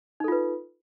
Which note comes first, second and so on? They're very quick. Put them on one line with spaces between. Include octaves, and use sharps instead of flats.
D#4 A4 F4 B4